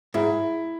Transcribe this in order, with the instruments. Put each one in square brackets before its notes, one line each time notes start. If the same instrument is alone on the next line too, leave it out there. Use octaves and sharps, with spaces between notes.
[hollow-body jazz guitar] G#2 [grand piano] E4